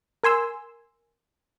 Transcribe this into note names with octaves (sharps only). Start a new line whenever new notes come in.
A#4 G#5 C6 E6